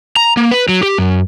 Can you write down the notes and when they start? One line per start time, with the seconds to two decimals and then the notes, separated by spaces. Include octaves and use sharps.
0.16 A#5
0.37 A#3
0.51 B4
0.69 F#3
0.83 G4
0.98 F#2